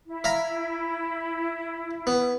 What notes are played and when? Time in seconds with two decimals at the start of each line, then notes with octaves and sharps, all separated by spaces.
0.07 E4
0.24 E5 F5 A#5
2.07 B3